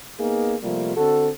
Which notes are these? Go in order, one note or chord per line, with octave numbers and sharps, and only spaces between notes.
A#3 B3 D#4 G#4
C3 F3 G3 A3 A#3 F4
D3 C4 F#4 A4